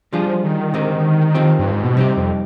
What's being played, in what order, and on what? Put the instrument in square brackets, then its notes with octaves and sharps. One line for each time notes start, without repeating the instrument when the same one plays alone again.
[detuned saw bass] F3 [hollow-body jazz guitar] G3 D4 F4 G#4
[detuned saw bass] D#3
[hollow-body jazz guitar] D3 G#3 C4 D#4 G4
F3 C4 D#4 G4
[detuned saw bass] G2
G#2
B2
[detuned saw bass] C3 [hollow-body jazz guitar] G3 C4 D#4 G4
[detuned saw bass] F2